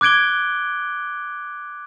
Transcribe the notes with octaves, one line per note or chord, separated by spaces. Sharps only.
D6 F#6 G#6 D7 G7